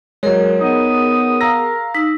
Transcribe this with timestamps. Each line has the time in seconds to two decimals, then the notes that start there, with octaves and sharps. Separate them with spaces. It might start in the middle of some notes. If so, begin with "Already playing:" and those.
0.23 F#3 G#3 G#4 A#4 C#5
0.61 B3 D#4 D#6
1.41 F5 A#5 E6 A#6
1.95 D#4 E6 B6